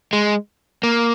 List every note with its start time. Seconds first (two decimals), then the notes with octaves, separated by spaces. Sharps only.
0.13 G#3
0.83 A#3